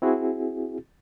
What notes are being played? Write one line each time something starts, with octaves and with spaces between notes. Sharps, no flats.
C4 E4 F#4 G#4